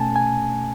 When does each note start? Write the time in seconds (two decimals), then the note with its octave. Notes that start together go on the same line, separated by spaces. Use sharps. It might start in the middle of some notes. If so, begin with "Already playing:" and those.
Already playing: B2 A3 C#4 G#5 A5
0.16 G#5